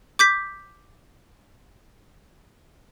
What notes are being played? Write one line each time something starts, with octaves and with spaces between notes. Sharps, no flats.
D6 G6 B6